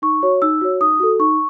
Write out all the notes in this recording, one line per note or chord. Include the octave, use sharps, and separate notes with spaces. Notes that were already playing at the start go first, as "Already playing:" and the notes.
D#4 C#6
F#4 C#5
D#4 E6
F#4 C#5
D#4 D#6
F#4 A4
D#4 C#6